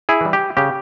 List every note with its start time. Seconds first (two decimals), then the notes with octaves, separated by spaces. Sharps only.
0.09 E4 G#4
0.21 E3 G3
0.33 G4
0.57 C#3 G4